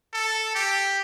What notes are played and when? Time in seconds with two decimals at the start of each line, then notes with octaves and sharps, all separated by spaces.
0.13 A4
0.55 G4